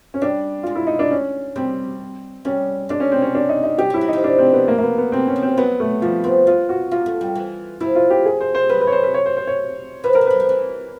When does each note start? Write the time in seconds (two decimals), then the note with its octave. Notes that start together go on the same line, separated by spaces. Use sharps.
0.14 C#4
0.22 G3 D4
0.63 G#3 F4
0.75 E4
0.87 D#4
0.99 D4
1.11 C#4
1.56 G3 C4
2.45 G3 C#4
2.89 G#3 D4
3.00 C#4
3.12 C4
3.22 C#4
3.35 D4
3.49 D#4
3.64 D#4
3.78 G3 G4
3.90 F#3
3.94 E4
4.01 F#3
4.09 F3 D#4
4.24 D4
4.38 C4
4.53 B3
4.68 A#3
4.78 A#3
4.83 B3
4.98 B3
5.12 E3 C4
5.27 C#4
5.36 F3
5.43 C4
5.58 F#3 B3
5.80 A3
6.02 F3 G3
6.24 B3 C4
6.47 B3 F4
6.69 F#4
6.91 A#3 F4
7.06 A3
7.21 G3
7.35 E3
7.80 F3 E4
7.95 F4
8.10 G4
8.26 G#4
8.41 C5
8.55 C5
8.69 F#3 B4
8.81 B4
8.87 C#5
8.92 C5
9.03 B4
9.14 C#5
9.26 C5
9.37 C5
9.47 C#5
10.04 F3 B4
10.13 F#3 A#4
10.21 F3
10.27 F#3 B4
10.40 F3
10.49 E3